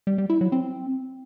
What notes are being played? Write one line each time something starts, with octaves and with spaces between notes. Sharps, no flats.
G3
G3
E4
F#3
C4